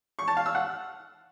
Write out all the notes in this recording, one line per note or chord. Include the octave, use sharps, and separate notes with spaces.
C#6
A5
F5
E6
F#5